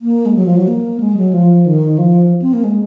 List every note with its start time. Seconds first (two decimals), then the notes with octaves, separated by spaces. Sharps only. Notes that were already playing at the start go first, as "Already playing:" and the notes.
0.02 A#3
0.26 G#3
0.35 F#3
0.46 F3
0.56 F#3
0.68 A#3
1.00 G#3
1.17 F#3
1.33 F3
1.66 D#3
1.98 F3
2.42 C4
2.53 A#3
2.64 G#3